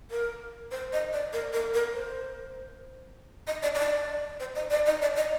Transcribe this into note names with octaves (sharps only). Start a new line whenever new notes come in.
A#4
C5
D#5
D5
A#4
A#4
A#4
C5
D#5
D5
D#5
D5
C5
D#5
D5
D#5
D5
D#5